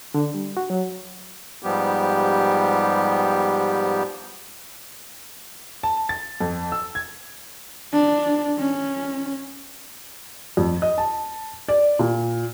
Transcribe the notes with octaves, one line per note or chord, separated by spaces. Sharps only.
D3
G3
F#4
F#3
G#2 F3 G3 B3 G4
A5
A6
F2
E6
G#6
D4
C#4
F2
D#5
A5
D5
A#2